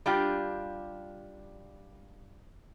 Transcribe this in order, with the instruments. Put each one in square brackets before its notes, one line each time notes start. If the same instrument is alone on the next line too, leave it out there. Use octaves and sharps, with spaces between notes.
[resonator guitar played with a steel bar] G3 D4 F4 G4